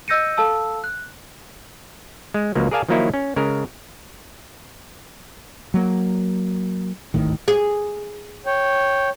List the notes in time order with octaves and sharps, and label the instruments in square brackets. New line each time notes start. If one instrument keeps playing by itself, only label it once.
[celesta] D#5 E6 G6 A#6 C#7 D#7
A4 F5 A5 E6
F#6
[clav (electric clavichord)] G#3
C#2 F3 F#3 A#3
G#4 A#4 D5 F5 G#5 A5
D#3 F3 F#3 A#3 D#4 E4
C#4
C#3 G#3 A#4
[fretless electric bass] F#3 A#3
D1 G#1 A2 D#3
[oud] G#4
[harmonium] C#5 G5